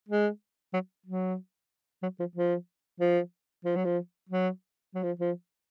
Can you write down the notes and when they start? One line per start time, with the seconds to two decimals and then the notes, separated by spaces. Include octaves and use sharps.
0.09 G#3
0.74 F#3
1.06 F#3
2.03 F#3
2.20 F3
2.36 F3
3.00 F3
3.65 F3
3.76 F#3
3.85 F3
4.29 F#3
4.95 F#3
5.03 F3
5.20 F3